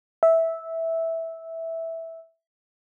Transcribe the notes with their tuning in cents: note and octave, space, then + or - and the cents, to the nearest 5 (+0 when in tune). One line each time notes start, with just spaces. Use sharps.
E5 -10